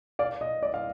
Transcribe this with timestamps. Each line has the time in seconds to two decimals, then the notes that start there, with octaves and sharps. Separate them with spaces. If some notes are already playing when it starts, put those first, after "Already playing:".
0.19 D5 F5
0.41 D#5
0.63 D5
0.74 F5